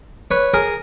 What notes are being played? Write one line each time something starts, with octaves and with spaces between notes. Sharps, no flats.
B4 C#5
G#4 A#4